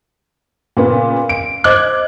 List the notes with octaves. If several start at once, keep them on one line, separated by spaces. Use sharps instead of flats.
A#2 C#3 B3
D7
C5 D#5 D6 F#6 G#6